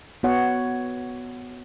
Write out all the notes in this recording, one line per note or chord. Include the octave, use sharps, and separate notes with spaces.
B3 F#4 C#5 F#5